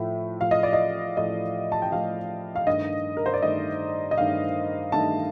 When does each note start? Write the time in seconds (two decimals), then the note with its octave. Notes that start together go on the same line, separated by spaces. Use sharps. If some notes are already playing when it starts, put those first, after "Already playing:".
Already playing: A2 F3 A3
0.41 A2 F3 A3 F5
0.51 D#5
0.63 D5
0.73 D#5
1.17 A2 F3 A3 D#5
1.72 A5
1.82 G5
1.92 A2 F3 A3 F5
2.56 F5
2.67 G2 D#3 A3 D#5
3.17 A#4
3.26 C5
3.33 D5
3.42 G2 D#3 A3 D#5
4.11 D#5
4.18 G2 D#3 A3 F5
4.92 G2 D#3 A3 A5